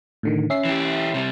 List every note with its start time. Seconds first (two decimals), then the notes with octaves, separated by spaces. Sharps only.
0.23 A2 D3 D#3
0.50 C#4 E5 C7
0.65 E3 G4
1.14 C3 G3